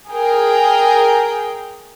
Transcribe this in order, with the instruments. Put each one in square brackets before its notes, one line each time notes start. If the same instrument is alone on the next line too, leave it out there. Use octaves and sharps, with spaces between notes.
[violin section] G#4 A#4 G5